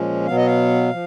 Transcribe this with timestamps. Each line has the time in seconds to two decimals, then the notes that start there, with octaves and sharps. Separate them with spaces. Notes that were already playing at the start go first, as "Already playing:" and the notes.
Already playing: A#2 F3 G#3 C#4
0.27 B2 F#3 B3 F5
0.37 D#5
0.46 F5
0.91 F3